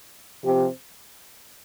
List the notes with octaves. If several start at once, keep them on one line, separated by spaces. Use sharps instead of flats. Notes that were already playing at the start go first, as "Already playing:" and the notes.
C3 F3 C4 G4